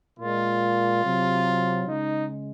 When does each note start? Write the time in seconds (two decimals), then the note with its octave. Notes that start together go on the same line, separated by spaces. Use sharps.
0.18 A#2 G#3 F4
1.02 C3 F#3
1.86 C#3 G#3 D#4